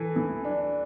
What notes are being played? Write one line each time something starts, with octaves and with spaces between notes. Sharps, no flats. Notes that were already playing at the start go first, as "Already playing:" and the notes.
Already playing: E3 A4
E3
D4